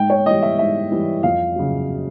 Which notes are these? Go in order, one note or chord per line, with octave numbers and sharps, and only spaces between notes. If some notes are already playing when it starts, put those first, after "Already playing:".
Already playing: G#2 G5
C#5
E3 G3 D#5
E5
G#2 E5
E3 G3
F2 F5
C#3 F#3